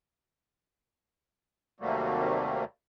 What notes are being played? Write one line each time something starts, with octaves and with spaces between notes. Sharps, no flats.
D#2 C3 F#3 G3 A3 A#3